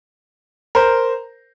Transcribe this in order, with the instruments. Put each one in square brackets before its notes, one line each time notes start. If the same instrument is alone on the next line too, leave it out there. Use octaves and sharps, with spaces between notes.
[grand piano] A#4 C5